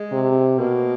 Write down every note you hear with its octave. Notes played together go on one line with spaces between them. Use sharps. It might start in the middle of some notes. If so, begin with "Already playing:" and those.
Already playing: G#3
C3
B2 A#3